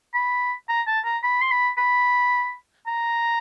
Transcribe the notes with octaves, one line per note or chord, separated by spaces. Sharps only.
B5
A#5
A5
A#5
B5
C6
B5
B5
A#5